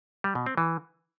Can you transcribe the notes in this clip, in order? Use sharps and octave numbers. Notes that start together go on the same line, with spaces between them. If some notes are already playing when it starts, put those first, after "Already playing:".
G3
B2
C4
E3